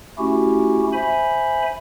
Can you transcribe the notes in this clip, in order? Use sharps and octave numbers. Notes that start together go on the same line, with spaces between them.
A3 C#4 E4 F#4 G4
C5 E5 G#5 B5